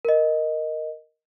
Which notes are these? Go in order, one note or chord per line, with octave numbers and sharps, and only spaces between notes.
A#4 D#5